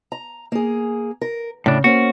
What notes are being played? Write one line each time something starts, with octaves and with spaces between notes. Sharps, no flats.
A#5
A#3 G#4
A#4
A2 C#3 D4
A#3 C#4 F#4 C5